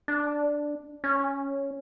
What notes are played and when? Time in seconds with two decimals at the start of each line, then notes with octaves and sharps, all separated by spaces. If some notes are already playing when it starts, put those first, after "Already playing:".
0.08 D4
1.04 C#4